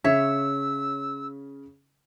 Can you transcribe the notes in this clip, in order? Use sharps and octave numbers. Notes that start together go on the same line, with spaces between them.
C#3 C#4 C#5 E5 E6 B6